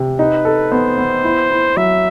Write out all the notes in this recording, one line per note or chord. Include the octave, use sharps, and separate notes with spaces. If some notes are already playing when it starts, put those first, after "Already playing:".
Already playing: C3
D#4 B4
A4
B3 C5
B3
E4
E4
F#3 E5